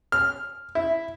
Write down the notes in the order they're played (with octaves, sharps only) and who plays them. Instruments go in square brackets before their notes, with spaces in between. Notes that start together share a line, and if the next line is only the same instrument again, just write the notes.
[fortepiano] F6
E4